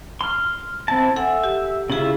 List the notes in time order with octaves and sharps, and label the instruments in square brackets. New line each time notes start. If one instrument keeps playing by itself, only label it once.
[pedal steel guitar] C6 F6
C4 E4 A5
[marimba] A4 F#5 G#5 [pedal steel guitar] E5
[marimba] G4
[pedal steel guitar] C#3 F4 E5 [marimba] E4 G#4